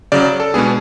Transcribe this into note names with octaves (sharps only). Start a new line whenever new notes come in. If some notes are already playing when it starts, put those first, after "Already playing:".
C#3 F#3 C#4 D5
A4
B2 G#3 B3 D4 G#4